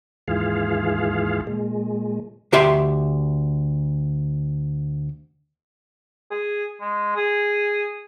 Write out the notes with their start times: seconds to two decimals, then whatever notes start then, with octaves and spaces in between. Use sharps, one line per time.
0.28 D#2 G#2 E3 F4 G#4 F5
1.47 A#2 G#3
2.53 D2 G4 E5 C6
6.31 G#4
6.81 G#3
7.16 G#4